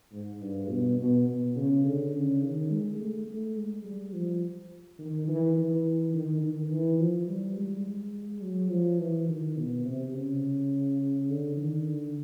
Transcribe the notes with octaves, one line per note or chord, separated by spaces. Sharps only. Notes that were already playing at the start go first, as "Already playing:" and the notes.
G#2
G2
B2
B2
B2
C#3
D3
C#3
D#3
G#3
A3
A3
G#3
G3
F3
D#3
E3
E3
D#3
D#3
E3
F3
G3
G#3
F#3
F3
E3
D#3
B2
C3
C#3
D3
D#3
D3